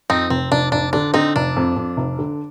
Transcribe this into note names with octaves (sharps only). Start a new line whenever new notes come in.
F2 C4 D#4
F1 C4
F1 D4
F1 D4
D3 D4
D3 C4 D#4
F1 D4
F2
F2
F1
D3